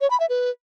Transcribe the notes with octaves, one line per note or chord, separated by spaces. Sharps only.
C#5
B5
E5
B4